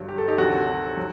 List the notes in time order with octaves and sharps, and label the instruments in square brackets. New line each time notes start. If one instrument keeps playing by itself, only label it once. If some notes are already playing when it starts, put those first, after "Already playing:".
Already playing: [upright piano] G1 G2 F#3
G4
A4
D#4 G4
D2 C3 D#3 F#3 F#4 A4
F#3